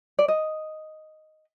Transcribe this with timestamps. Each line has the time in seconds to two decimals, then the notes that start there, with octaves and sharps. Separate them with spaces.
0.19 D5
0.28 D#5